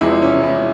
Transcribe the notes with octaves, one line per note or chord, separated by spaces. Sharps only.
E1 E2 C3 F3 G#3 E4
C#4
E4